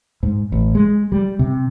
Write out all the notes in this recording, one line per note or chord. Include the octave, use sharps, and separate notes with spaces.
G#2
A1
G#3
G3
C3